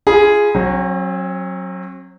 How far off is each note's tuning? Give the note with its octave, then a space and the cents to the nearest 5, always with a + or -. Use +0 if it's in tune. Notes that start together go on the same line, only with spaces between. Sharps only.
F4 -20 G#4 +0 B5 -35
F#3 +0 C4 +45